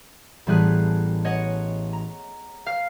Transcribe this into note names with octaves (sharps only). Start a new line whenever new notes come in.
A1 A2 G3 B3 G#4 F#6
C#5 D#5 F#5
A#5
F5 F6 C7